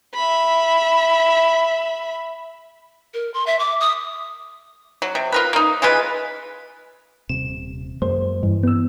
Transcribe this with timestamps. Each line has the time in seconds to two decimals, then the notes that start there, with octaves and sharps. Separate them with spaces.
0.15 E5 B5
3.14 A#4
3.34 C6
3.47 E5
3.59 D6
3.80 D#6
5.02 F#3
5.15 C3
5.32 F4 A#4 B4
5.53 A#3 D#4
5.82 E3 G#3 F4 B4
7.29 D#1 C3 E7
8.02 F#2 G#3 A#3 C5
8.43 G2 E3
8.63 B3 E6